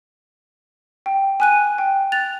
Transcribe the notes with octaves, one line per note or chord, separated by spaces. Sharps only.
G5
G#5 F#6 D#7
G5
F#6 A6 F7